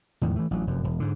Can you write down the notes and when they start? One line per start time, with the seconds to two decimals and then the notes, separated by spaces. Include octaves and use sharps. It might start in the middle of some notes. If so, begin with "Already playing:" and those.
0.22 E2 A2 D#3 F#3
0.36 E3 A3
0.51 A1 F#3
0.67 F1 F#2
0.84 E1
1.00 G#2 D3